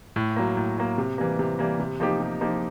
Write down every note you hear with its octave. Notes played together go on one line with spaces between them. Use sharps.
A2
F#3 A#3
A2
F#3 A#3
C3
E3 G3 A#3
C3
E3 G3 A#3
C3
F3 A#3 D#4 G4
C3
F3 A#3 D#4 G4